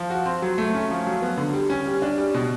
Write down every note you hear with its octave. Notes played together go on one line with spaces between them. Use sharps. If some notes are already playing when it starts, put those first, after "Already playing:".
Already playing: F3
F#4
C4
F#3
A3
C#4
F3
F#3
B3
D3
G3
C#4
G3
D4
G3
B2